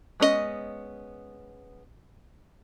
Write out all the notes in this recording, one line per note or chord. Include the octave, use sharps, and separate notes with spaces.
G#3 B3 C#4 F4 D#5